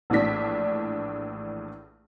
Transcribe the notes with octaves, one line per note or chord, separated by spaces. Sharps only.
A#1 A2 E3 D4 B6